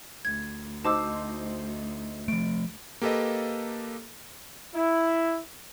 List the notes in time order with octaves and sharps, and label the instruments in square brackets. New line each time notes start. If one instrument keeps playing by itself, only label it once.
[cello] D2 [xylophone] G#6
[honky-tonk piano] D#4 F#4 C5 [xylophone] A5 D6 E6
[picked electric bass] F3 A3 [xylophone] D7
[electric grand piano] A#3 G4 A4 B4 D#5
[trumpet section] E4